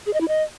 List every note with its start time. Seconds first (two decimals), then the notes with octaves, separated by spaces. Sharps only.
0.06 G#4
0.13 D#5
0.21 E4
0.28 D#5